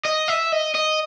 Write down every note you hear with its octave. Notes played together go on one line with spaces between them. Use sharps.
D#5
E5
D#5
D#5